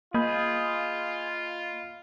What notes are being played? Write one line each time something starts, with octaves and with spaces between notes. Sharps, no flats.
A#3 F4 G#4 D#5 B5 G6